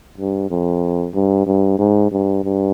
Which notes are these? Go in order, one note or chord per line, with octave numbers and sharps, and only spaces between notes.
G2
F2
G2
G2
G#2
G2
G2